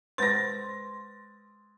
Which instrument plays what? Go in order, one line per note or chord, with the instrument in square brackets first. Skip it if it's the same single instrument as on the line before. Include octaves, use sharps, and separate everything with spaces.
[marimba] G#3 B4 C5 [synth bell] C6 [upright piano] A6 A#6